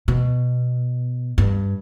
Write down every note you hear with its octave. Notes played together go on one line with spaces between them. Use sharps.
B2
G2